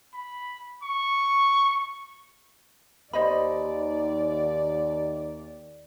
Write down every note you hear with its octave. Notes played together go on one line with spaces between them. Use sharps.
B5
C#6
D#2 C5 D5 D#5 B5